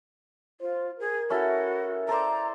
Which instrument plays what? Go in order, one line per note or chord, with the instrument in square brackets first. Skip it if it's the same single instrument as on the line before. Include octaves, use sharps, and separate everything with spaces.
[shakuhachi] F4 [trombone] C5
[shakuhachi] G#4 [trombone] A#4
[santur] C#4 E4 A4 [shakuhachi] F#4
[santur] A4 C5 D5 [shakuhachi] A#5